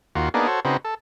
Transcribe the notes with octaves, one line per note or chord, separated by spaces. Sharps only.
D#2 F4 F#4
A#3 B3 D4 D#4 G#4
F#4 A4 C5 C#5
C#3 C4 D#4 F#4 B4
A4